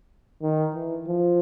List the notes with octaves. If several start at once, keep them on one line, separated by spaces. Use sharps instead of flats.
D#3
E3
F3